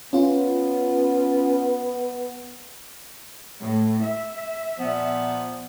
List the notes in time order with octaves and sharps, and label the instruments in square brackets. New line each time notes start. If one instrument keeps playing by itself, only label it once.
[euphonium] B3 [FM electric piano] C#4 F4
[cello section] A2
E5
[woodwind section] A#2 F3 B3